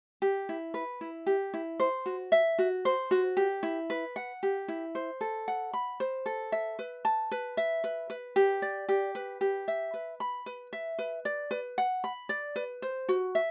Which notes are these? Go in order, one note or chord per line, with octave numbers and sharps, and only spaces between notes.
G4
E4
B4
E4
G4
E4
C5
F#4
E5
F#4
C5
F#4
G4
E4
B4
F#5
G4
E4
C5
A4
F#5
B5
C5
A4
E5
B4
A5
B4
E5
B4
B4
G4
D5
G4
B4
G4
E5
B4
B5
B4
E5
B4
D5
B4
F#5
B5
D5
B4
C5
F#4
E5